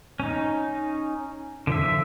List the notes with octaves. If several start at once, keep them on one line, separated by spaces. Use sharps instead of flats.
C#4 D#4
D3 F3 E5